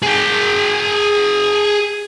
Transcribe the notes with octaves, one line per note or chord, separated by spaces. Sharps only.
G#4 G5